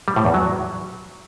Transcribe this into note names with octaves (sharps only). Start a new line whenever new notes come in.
G3
A2
E2
F#3